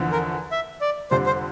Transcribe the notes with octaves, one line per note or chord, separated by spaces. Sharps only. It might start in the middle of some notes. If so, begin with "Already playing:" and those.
Already playing: E2 D3 F3
A#4
E5
D5
F2 D3 G3 C5
C5